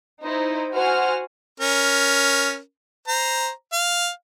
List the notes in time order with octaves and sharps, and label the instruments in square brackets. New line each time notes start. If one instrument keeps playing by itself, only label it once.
[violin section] D#4 E4 C5
F#4 C5 F#5 G#5 F6
[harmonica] C#4 A#4
C5 A#5
F5